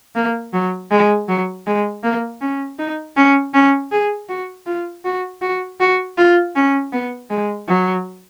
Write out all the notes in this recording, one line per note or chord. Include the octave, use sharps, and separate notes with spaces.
A#3
F#3
G#3
F#3
G#3
A#3
C#4
D#4
C#4
C#4
G#4
F#4
F4
F#4
F#4
F#4
F4
C#4
B3
G#3
F#3